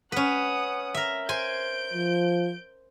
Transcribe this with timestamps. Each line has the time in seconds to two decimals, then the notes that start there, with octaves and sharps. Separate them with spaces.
0.12 C#4 B4 F#5 D#6
0.94 A#4 E5
1.29 C5 G#5 G6 D7
1.94 F3